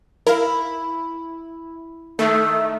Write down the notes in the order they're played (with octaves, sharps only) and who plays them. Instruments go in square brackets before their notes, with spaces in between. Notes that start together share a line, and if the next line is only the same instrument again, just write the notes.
[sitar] E4 [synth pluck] A#4 F5
[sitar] D#3 [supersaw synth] A3 [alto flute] E5